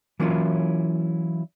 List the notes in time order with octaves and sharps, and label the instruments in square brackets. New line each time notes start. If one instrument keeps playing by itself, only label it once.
[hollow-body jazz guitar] E3 F#3 A#3 C#4 E4 F4